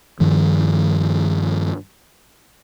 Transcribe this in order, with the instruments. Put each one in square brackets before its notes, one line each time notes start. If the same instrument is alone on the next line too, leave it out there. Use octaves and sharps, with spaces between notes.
[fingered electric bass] G2 D#3 F3